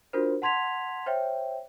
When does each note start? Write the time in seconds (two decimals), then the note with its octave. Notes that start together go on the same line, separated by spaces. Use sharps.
0.13 D4 F4 F#4 A#4 C5
0.42 F#5 A5 C6 G#6 B6 F7
1.06 C5 C#5 E5 G5